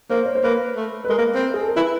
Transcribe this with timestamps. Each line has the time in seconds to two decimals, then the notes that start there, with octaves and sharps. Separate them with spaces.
0.10 A#3 C5
0.26 C#5
0.35 C5
0.44 A#3 B4
0.76 A3
1.04 B4
1.09 G#3 A#4
1.18 A#3
1.35 C4
1.54 G#4
1.61 A4
1.68 A#4
1.76 E4 B4